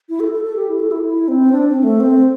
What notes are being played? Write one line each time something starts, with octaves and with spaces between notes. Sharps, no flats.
E4
A4
A4
A4
G4
E4
A4
E4
E4
C4
D4
C4
A3
C4